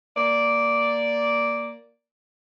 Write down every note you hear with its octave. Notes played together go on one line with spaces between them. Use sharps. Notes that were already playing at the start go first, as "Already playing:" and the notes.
A#3 D5